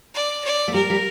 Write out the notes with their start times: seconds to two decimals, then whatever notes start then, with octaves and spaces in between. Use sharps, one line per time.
0.14 D5
0.44 D5
0.68 A3
0.74 G3 A#4
0.90 G3